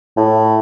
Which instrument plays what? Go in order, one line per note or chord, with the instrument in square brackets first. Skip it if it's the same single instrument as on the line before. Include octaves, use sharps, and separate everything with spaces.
[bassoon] A2